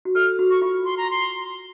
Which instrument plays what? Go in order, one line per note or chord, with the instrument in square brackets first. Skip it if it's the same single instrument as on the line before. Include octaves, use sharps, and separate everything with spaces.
[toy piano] F#4
[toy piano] A4 [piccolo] F6
[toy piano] F#4
[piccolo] C#6
[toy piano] F4
[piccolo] C6
A#5
C6